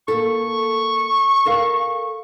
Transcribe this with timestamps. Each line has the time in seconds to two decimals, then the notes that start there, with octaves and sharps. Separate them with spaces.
0.08 A#3 A4 C#6
1.46 A4 A#4 F5